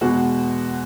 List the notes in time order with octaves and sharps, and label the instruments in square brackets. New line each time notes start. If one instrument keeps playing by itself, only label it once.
[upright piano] E2 B2 G#3 F#4